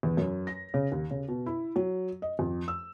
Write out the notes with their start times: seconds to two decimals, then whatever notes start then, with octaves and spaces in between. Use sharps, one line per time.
0.03 E2
0.17 F#2
0.47 A#6
0.74 C#3
0.92 D#2
1.11 C#3
1.28 B2
1.46 E4
1.76 F#3
2.22 D#5
2.39 F2
2.68 E6